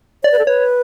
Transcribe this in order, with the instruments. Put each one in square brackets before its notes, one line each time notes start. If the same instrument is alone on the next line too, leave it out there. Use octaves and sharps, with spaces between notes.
[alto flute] C#5 [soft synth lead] D5
[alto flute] B4
A4
[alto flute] B4 [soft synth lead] C#5